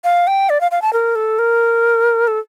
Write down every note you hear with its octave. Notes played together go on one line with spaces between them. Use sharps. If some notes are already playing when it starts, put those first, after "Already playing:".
F5
G5
D5
F5
F5
A5
A#4
A4
A#4
A4